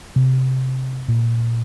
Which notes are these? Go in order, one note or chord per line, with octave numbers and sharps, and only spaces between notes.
C3
A#2